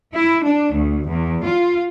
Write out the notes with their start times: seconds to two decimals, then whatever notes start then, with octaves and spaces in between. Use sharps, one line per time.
0.13 E4
0.44 D4
0.73 D2
1.09 E2
1.44 F4